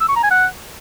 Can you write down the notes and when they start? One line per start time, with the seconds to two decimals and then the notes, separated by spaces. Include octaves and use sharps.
0.01 E6
0.09 C#6
0.16 A#5
0.24 G#5
0.31 F#5